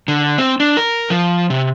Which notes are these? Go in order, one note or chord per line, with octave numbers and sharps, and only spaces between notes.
D3
C4
D4
A#4
F3
C3